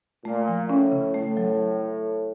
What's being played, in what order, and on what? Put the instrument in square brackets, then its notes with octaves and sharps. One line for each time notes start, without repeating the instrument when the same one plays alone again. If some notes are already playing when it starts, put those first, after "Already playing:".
[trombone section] A#2 [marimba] A3
[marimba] F3
[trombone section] A2 [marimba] C#4
[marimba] C#3
[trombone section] A2 [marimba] A3
[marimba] F#3